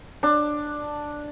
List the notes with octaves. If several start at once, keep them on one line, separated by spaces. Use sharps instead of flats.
D4